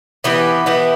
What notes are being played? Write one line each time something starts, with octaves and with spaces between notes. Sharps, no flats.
E3 B3 E4 G4
E3 B3 E4 G4